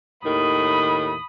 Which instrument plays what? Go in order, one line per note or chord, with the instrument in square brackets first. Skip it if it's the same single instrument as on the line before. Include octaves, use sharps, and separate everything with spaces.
[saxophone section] D#2 A2 D#3 [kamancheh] B5 D#6